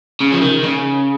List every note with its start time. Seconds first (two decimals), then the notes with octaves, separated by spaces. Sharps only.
0.20 C#3
0.32 F3
0.42 D#3
0.63 C#3